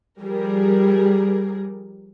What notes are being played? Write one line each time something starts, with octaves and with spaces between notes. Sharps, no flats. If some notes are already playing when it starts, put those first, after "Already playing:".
F3 G3 G#4 A#4